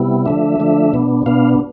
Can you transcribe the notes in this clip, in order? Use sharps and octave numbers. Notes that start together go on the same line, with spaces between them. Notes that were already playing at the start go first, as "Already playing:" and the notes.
Already playing: C3 G3 B3 E4
D3 F3 A3 D4 E5
D3 F3 A3 D4
B2 B3 D4
B2 B3 D4 F5